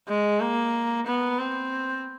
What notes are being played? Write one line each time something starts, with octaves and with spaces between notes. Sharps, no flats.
G#3
A#3
B3
C4